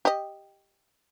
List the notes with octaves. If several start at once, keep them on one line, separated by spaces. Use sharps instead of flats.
G4 D#5